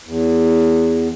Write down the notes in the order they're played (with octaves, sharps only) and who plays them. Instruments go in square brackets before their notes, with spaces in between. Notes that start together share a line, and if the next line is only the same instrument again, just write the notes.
[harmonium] E2